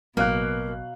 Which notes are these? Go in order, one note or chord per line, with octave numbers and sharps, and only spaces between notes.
A1 B2 F#3 A#3 F5 F#6